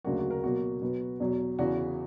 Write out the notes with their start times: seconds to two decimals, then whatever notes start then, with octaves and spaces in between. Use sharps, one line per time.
0.05 D2 C#3 F#3 A#3 F#4
0.18 F#4
0.31 A#4
0.44 B2 F#3 A#3 F#4
0.81 B2 F#3 B3
1.20 E2 B2 F#3
1.59 E2 C#3 E3 F#4